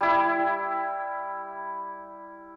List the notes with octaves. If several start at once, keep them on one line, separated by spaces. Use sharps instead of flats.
G3 E4